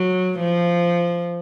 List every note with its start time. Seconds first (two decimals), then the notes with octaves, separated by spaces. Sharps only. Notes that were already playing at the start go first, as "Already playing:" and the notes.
Already playing: F#3
0.40 F3